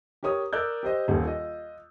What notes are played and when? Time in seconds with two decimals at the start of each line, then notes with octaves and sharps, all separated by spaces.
0.23 G4 A#4 C#5 D#6
0.53 A#4 D5 E6 F#6 G6
0.83 G4 C5 D#5
1.08 D#1 D#2
1.23 F4 D#5